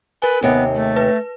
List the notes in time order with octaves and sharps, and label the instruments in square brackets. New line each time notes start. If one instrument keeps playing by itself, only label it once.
[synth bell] A#4 G#5 [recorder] B4
[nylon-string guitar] D#2 C3 [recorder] B3
[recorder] A3
[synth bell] B4